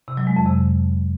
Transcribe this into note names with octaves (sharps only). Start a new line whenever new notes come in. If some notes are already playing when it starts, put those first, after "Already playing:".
C3
F#3
G#3
F2
C3